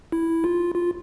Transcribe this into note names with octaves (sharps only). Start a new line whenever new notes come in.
E4
F4
F4